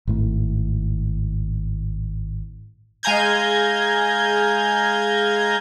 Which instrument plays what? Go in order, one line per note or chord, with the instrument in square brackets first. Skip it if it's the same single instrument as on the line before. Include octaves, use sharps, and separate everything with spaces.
[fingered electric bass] G#1 A2
[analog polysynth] G#3 F5 G#5 A#5 G6 G#6